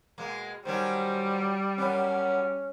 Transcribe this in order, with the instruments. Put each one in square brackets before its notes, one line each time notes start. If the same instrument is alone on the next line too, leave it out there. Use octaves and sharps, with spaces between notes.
[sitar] B2 G#3 A#3
[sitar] D#3 F#3 C#4 [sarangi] G3 [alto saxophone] C5
[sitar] F#2 B3 [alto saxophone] C#4